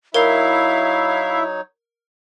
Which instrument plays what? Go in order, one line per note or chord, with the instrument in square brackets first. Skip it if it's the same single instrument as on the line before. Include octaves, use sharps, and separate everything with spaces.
[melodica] F#3 D#4 C#5 [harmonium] E4 E5 [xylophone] A#4 [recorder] F5